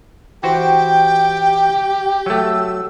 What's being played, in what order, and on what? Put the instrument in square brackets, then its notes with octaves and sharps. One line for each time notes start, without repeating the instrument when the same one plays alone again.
[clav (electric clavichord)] E3 F#4 C5 [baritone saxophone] G4 [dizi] G5
[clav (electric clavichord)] F#3 A3 [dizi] E6